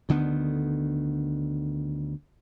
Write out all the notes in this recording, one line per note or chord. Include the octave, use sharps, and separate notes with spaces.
D2 D3 D#3 B3